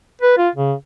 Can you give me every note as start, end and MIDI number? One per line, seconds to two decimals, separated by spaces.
0.22 0.35 71
0.38 0.49 65
0.55 0.73 49